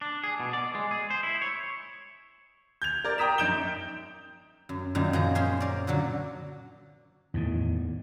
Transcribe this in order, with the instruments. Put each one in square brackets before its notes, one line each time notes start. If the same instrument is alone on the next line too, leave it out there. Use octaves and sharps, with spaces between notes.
[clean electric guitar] D4
G#4
B2
D5
G#3
G#4
C5
E4
C#5
[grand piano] G6 G#6 F7
A#4 D5
G5 A#5 D#6 B6 E7
F#2 D#4 G6 D7 E7 G7
[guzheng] F#2
F#2 A#2 D#3
F#2 F3 G#4 A#5
C#4 C5 C6
A#4 D5
A#2 D3 F#3
[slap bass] E2 A2 D#3